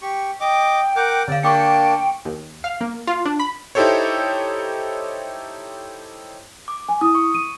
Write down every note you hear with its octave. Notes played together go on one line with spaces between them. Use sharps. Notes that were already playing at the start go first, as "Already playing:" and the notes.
G4 C#6
D#5 G5 D6
A#4 F#5 D6 G6
D3 D5 F5
A#3 D4 G5 A5 C#6 D6 C#7
D#2
F5
A#3
F4
D4
B5
D#4 E4 G4 A4 C5 C#5
D6
G#5
E4 D#6
C#6
D#7